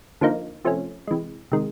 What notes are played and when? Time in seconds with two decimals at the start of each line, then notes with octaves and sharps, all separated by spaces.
0.21 D3 F3 A#3 D#4
0.65 C3 F3 A3 C#4
1.07 C3 E3 G#3
1.52 C3 D#3 G#3